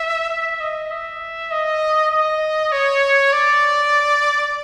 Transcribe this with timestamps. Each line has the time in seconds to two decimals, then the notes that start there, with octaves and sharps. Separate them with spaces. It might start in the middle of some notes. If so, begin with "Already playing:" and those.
Already playing: E5
0.30 E5
0.60 D#5
0.91 E5
1.51 D#5
2.11 D#5
2.72 C#5
3.33 D5